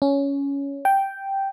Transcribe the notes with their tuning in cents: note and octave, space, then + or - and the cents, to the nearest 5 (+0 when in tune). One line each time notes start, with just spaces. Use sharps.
C#4 +10
G5 -5